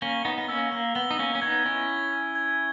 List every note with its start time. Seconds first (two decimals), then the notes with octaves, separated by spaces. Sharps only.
0.02 A#3 C#4 G7
0.25 B3 D#4
0.38 B3
0.48 A#3 C#4 E6
0.72 A#3
0.95 B3 G7
1.11 D#4
1.19 A#3 C#4
1.35 C#4
1.42 B3 D#4 G#6
1.65 C#4 E4
1.89 G7
2.35 G#6